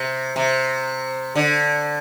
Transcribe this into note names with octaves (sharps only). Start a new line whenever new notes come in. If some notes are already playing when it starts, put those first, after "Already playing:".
Already playing: C3
C3
D3